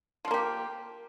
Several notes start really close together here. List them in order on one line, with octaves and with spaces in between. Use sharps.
F3 F4 A#3 G4